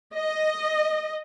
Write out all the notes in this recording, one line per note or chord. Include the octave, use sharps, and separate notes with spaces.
D#5